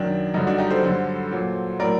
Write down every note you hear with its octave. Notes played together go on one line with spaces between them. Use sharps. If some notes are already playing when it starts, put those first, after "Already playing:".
Already playing: F#2 D#3 F#3 D4
G2 D3 F#3 D#4
D4 F#4
D#4 G4
A4 C5
G2 D3 F#3
A#2 F#3
A2 F#3 A#4 D5